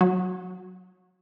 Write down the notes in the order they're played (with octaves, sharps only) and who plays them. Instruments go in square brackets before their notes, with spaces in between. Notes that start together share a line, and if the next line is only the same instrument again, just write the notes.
[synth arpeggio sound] F#3